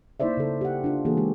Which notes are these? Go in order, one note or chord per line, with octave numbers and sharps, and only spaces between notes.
A#3 D#4 E4 C5 D5 E5
C#3 A4
G4 F#5
D4 F4
E3 A#3 F#4 G#4 A4
G#3 G4